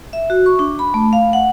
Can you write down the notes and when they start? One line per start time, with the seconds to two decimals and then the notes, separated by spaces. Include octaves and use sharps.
0.13 E5
0.30 F#4
0.46 C#6
0.59 D4
0.79 B5
0.94 A3
1.13 F5
1.33 F#5